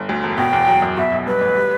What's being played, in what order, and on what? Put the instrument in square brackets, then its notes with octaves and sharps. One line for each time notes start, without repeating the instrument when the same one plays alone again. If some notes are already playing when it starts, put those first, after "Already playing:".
Already playing: [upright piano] G1
D2
E1
[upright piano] B2 [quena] G5
[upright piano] E2
F#3
F#2
[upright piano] B2 [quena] E5
[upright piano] B1
[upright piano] G2 [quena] B4
[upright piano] A1
G3